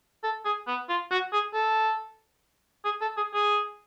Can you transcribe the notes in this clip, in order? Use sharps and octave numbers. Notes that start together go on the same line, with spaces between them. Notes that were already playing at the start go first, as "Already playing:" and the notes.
A4
G#4
B3
F4
F#4
G#4
A4
G#4
A4
G#4
G#4